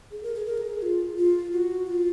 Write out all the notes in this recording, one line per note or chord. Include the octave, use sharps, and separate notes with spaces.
G#4
A#4
G#4
A#4
G#4
F4
F4
F#4
F4